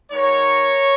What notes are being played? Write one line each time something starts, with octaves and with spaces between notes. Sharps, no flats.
G#3 D#4 F#4 A#4 C#5